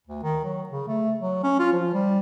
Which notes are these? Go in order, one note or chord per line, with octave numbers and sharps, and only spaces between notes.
D2
D#3
F#3
C#3
A3
F#3
C#4
F4
F3
G3